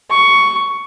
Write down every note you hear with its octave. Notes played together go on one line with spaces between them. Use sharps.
C#6